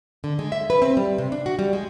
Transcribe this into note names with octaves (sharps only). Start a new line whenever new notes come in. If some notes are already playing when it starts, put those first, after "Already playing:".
D3
G#3
E5
B4
C4
G3
C3
D4
F#4
G3
G#3